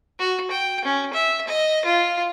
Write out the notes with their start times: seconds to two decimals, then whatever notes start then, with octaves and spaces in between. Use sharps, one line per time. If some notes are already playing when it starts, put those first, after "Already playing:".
0.19 F#4
0.51 G5
0.85 C#4
1.14 E5
1.48 D#5
1.85 F4